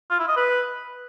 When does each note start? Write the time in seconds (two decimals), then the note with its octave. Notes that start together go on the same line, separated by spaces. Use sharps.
0.10 F4
0.19 E4
0.28 D#5
0.37 B4